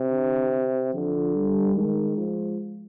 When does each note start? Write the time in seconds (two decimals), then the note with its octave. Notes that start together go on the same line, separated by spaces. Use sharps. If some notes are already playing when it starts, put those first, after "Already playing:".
Already playing: C3
0.11 D3
0.93 D3 F3
1.35 G3
1.76 D#3 G#3
2.17 F3